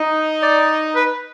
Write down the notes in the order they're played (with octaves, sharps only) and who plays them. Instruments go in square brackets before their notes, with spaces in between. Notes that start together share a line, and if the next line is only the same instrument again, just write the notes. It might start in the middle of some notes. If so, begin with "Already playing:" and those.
Already playing: [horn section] D#4
[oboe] D5
B4